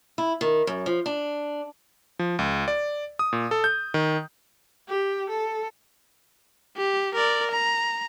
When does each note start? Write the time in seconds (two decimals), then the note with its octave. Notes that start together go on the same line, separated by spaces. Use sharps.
0.18 E4
0.41 D#3
0.67 F#2
0.86 F3
1.06 D4
2.19 F3
2.39 C#2
2.68 D5
3.19 D#6
3.33 A#2
3.51 A4
3.64 G6
3.94 D#3
4.88 G4
5.30 A4
6.77 G4
7.15 A#4 D5
7.51 A#5